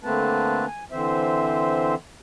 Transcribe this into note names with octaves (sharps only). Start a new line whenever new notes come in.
D3 A3 A#3 C4 B4 A5
G#5
D3 E3 C4 C5 E5